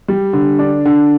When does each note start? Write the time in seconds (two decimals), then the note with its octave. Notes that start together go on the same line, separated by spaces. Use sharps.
0.08 G3
0.33 D3
0.59 D4
0.85 D3